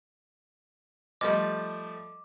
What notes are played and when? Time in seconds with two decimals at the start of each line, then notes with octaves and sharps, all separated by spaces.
1.21 F3 G3 A3 D#5 D6